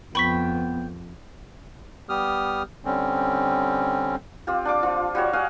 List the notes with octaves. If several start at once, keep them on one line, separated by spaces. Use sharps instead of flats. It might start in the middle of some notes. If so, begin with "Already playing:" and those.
F2 B3 G5 B5 C#6 B6
G3 B3 G4 D#6 F6
D3 G3 C4 C#4
C4 F4 G4
D4 F4 D6
F3 F4
G3 F#4 C#5
F#4 D#5 F5 G#5